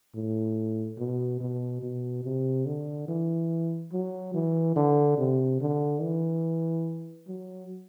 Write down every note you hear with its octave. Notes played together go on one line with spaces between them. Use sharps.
A2
B2
B2
B2
C3
D3
E3
F#3
E3
D3
C3
D3
E3
F#3